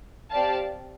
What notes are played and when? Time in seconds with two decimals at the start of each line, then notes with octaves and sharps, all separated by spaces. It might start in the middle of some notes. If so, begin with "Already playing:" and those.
0.31 C4 G4 D5 F5 A5